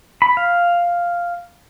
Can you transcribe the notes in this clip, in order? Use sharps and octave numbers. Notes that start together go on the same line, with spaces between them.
B5
F5